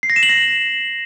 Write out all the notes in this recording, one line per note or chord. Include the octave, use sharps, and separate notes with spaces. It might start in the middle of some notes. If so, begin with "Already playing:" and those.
C7
A#6
E7
F#7
A#6